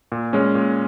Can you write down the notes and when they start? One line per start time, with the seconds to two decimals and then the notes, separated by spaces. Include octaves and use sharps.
0.12 A#2
0.33 G#3 C#4
0.55 A#2